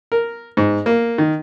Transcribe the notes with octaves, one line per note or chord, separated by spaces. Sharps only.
A#4
G#2
A#3
D#3